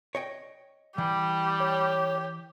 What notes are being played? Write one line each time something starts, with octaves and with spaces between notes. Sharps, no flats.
C#5 D#5 G5
E3 G3 G4
C#5